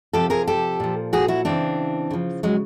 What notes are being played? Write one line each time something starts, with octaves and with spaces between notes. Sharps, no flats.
C3 F3 G4 A4
G#4 A#4
G4 A4
A#2 F3
F#4 G#4
E4 F#4
C#3 E3 C4 D4
C#3 F3
F#3 G#3